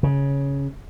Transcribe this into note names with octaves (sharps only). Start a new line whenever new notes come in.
C#3